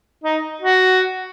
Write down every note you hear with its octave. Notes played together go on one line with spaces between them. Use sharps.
D#4
F#4